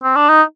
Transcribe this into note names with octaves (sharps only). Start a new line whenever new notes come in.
C4
D4
D#4